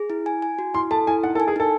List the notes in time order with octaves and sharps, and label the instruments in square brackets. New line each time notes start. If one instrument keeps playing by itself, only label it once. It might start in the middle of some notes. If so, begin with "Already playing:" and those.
Already playing: [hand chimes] G#4
E4
G#5
G#5
F#4
[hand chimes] E4 [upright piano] C6
[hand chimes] A4 [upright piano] A5
[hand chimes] E4 [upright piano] G#5
[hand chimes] D#4 [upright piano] F#5
[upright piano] A4
[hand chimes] G#5
[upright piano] G#4
[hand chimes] D#4 [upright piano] A4